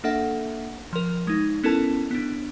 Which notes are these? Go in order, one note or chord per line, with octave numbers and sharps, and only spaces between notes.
A#3 D4 A4 E5 F#5
F3 A#4
G#3 D#4
B3 C#4 E4 A4 A#4 A5
B3 D4